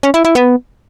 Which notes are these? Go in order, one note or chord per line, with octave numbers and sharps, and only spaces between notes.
C#4
E4
E4
B3